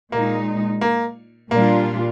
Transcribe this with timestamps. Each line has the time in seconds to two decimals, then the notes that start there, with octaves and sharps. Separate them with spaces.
0.12 A#2 G#3 A#3 D#4
0.81 A#3
1.50 A#2 G3 A#3 D4 F4